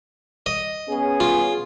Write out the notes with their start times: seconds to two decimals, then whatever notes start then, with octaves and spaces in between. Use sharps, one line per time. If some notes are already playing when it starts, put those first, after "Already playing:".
0.46 D#5
0.88 B3 C#4 G#4
1.20 F4